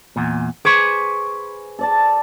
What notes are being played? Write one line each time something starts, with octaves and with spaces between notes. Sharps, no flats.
E2 A#2
G#4 B4 C5 C#6 D6
A4 D5 A5